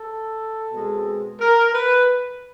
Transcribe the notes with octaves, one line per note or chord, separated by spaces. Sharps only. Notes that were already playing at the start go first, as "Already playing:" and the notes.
Already playing: A4
B2 G#3 C4
A#4
B4